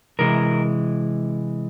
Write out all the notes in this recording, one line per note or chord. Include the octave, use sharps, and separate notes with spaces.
C3 E3 G#3 A#4